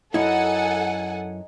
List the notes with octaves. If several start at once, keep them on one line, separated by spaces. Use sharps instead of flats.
F#2 D#4 E4 A4 F#5 G#5